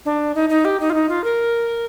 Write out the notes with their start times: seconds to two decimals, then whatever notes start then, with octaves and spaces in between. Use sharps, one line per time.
0.05 D4
0.35 D#4
0.49 D#4
0.65 G4
0.80 D#4
0.90 F4
0.94 D#4
1.09 F4
1.24 A#4